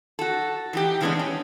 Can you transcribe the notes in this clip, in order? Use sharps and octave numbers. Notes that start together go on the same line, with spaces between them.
F#4 A4
E3 D#4 G4
C#3 E3 G#3 B3 C#4 D4
C#4